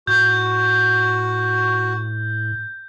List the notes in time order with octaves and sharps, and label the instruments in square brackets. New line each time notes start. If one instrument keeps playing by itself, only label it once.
[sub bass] A2 [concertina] F#4 [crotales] G6